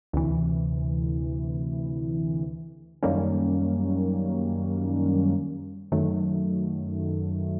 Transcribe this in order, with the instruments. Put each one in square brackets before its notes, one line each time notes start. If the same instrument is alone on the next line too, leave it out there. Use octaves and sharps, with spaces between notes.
[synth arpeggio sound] D2 C3 E3
F#2 D#3 G3 A#3 C#4
F#2 D#3 F#3 A3